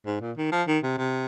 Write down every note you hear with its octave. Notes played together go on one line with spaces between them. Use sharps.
G#2
A#2
D#3
F3
D#3
C3
C3